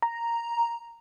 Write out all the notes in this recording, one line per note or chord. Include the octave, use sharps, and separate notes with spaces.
A#5